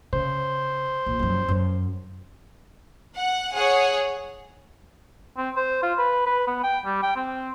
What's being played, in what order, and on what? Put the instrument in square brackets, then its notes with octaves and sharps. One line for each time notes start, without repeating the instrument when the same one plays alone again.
[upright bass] C#3 [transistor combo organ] C5
[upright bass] A#1
F#2 F3
F#2
[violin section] F#5
G#4 C#5 F#5
[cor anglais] C4
C5
F4
B4
B4
B3
G5
G3
G5
C4